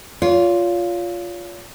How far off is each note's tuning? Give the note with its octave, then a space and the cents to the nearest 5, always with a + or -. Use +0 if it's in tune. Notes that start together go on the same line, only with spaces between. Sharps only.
F4 +0 C#5 +45